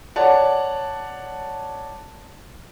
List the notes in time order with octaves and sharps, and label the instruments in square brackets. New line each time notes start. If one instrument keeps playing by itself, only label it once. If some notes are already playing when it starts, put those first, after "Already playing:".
[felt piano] C#5 D5 F#5 A5